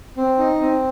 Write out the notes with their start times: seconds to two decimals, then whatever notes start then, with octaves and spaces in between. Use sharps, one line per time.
0.17 C4
0.38 D#4
0.60 C4